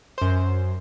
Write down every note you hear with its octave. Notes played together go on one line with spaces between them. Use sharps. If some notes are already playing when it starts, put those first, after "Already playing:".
F#2 C5